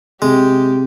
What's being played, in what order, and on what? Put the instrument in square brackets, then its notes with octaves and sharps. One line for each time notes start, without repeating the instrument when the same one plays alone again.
[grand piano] C3 [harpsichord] G#3 [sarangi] G4